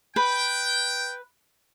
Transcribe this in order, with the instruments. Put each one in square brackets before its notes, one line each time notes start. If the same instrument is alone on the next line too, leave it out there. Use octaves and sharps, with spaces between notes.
[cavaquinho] B4 [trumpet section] G5